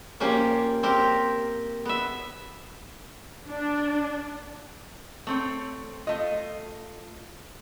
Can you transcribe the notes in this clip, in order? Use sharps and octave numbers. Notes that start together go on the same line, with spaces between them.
F3 A#3 C#4 G4
C4 G4 A#4
B3 E5
D4
A3 C4 C#5
A3 F4 D#5